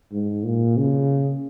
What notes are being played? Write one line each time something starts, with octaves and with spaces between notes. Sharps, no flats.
G#2
A#2
C#3